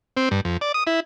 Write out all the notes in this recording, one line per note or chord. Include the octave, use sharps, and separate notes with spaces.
C4
G2
F2
D5
D#6
E4